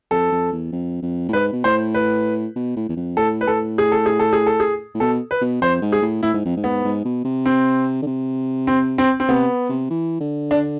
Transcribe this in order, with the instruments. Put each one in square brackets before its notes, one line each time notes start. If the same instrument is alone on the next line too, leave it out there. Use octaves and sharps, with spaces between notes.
[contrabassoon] F2 [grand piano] A4
[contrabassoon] F2
E2
F2
F2
A2
[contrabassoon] G#2 [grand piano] B4
[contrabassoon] B2
[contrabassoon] A2 [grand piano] C5
[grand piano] B4
[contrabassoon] B2
A2
E2
F2
[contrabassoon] A2 [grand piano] A4
[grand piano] B4
[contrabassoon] A2 [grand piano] A4
[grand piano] G#4
A4
G#4
A4
G#4
A4
G#4
[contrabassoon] A2
[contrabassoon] B2 [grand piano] A4
[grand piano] B4
[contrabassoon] B2
[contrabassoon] F2 [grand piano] C5
[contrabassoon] G#2
[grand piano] G#4
[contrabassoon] A2
[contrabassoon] A2 [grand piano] E4
[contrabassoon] G#2
F2
G#2
[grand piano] B3
[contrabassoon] G#2
B2
C3
[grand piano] C4
[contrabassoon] D3
C3
[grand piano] C4
C4
C4
[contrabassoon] C3 [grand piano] B3
[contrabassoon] C3
E3
D3
[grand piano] D4